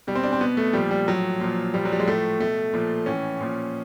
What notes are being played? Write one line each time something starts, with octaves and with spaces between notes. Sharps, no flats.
B2 G3
C4
D4
C4
B2 B3
A3
A#2 F3 G3
G3
A2 F3 F#3
A#2 F3
A#2 F3 G3
F#3
G3
G#3
A2 F3 A3
B2 A3
A#2 F3
A2 E3 C#4
A#2 F3